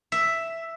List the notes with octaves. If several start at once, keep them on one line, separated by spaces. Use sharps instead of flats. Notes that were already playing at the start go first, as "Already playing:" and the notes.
E5